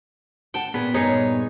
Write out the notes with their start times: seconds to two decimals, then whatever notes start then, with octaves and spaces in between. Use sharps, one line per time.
0.54 F#5 G5 A5
0.74 A#2 B3 G#4 B4
0.94 G2 A#2 D#4 G#4 C#5